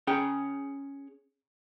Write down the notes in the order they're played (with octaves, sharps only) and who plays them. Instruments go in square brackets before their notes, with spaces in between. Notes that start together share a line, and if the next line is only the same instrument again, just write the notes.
[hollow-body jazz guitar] C#4 G#4 G5